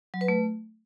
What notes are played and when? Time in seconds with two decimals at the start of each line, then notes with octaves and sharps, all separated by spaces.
0.14 F#3
0.21 B4
0.28 A3